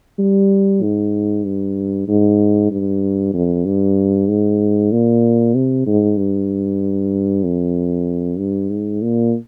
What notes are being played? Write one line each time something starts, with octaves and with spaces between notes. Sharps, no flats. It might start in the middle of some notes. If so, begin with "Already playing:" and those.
G3
G#2
G2
G#2
G2
F2
G2
G#2
A#2
C3
G#2
G2
F2
G2
G#2
A#2